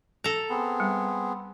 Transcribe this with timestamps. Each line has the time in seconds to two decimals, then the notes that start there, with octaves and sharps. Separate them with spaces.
0.24 A4 A#5
0.50 B3 C4 G#4
0.80 G3